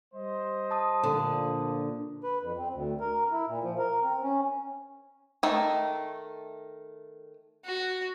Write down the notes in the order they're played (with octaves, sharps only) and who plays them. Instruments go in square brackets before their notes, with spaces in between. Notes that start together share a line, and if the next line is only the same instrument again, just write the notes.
[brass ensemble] G3 C5 D#5
[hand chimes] A5 D#6
[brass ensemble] A#2 F3 D4 [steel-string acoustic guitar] D3
[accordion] B4
F2
C4
D2
A#4
E4
A#2
F3
A#4
C4
C#4
[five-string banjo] D#3 A3
[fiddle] F#4